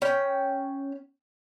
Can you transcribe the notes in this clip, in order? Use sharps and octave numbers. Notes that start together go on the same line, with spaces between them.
C#4 G5